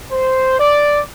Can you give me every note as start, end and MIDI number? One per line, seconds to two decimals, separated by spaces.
0.12 0.57 72
0.59 1.01 74